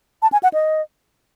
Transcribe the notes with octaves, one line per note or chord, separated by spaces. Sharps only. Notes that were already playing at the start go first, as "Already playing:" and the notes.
A5
G#5
F#5
D#5